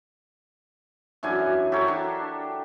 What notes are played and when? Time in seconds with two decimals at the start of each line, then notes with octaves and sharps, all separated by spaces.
1.23 F#2 E3 D4 G#5
1.72 G4 A4 A#4 C#5
1.88 D4